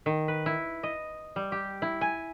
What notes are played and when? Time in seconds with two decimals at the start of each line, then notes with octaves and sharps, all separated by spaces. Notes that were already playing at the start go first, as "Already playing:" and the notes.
0.06 D#3
0.28 B4
0.46 E4
0.83 D#5
1.36 G3
1.52 G4
1.82 E4
2.01 G#5